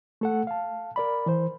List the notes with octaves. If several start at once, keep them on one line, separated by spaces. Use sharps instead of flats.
A3 A4 F#5
F5 A5
A#4 D5 B5
E3 C5